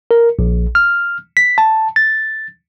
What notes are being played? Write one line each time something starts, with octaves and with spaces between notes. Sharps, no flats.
A#4
A#1
F6
B6
A5
A6